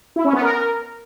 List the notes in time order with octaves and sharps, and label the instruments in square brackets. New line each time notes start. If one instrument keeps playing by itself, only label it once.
[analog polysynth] E4
C#4
B3
A#4